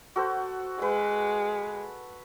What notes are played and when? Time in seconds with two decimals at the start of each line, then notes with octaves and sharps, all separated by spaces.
0.16 F#4 A4 C5
0.82 G#3 B4